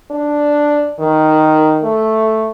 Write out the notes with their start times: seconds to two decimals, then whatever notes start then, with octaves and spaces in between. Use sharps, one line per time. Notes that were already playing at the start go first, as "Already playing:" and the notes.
0.11 D4
1.00 D#3
1.84 A3